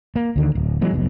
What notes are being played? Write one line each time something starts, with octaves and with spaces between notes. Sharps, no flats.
A#3
D2 D3 D#3
D1
E3 F#3 G#3 B3
F1 B1 B2